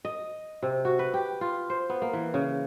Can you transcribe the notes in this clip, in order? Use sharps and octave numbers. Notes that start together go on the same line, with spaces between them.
D#5
C3
F#4
B4
G4
F4
C5
B3
A#3
E3
C#3